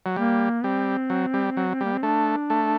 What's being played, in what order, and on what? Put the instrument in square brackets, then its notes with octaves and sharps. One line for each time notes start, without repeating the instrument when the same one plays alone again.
[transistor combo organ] F#3
[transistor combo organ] G3 [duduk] A#3
[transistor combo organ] G3 [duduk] C4
[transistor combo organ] F#3
G3
F#3
[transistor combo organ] G3 [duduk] A#3
[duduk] C4
[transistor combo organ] A3 [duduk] D4
[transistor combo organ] A3